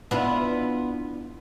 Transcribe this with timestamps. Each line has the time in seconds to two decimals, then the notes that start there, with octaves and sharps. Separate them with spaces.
0.11 B3 D4 E4 F4